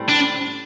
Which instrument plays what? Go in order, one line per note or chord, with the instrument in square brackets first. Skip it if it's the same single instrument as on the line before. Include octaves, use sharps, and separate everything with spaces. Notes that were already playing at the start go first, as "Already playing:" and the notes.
Already playing: [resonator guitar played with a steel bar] A2 G3 C4
[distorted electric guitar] D4